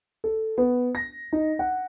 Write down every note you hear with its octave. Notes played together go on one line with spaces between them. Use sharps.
A4
B3
A#6
D#4
F#5